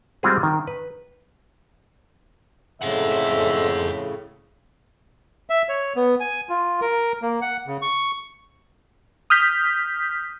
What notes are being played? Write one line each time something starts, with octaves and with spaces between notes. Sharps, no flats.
G3 G#3 C4 F4 F#4 G#4
D#3
B4
F2 A2 C#3 G#4 E5 F#5
E5
C#5
B3
G#5
F4
A#4
A#3
F#5
C#3
C#6
D#6 F6 G6 B6